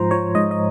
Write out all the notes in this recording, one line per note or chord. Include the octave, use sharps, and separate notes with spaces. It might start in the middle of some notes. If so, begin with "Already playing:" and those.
Already playing: G#2 F3 C5 A#5
F3 C#5
G#2 D#5
D#5